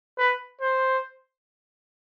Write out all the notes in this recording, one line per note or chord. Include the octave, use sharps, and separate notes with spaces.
B4
C5